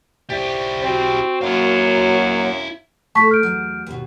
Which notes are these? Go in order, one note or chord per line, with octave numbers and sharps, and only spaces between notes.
E4 G4 C5 D5 E5
C4 F#4
F#2 F#3 A#3 E4 F5
A3 A4 D5 A5 C#6 B6
F6 G6 D7
E2 F#3
D#2 B2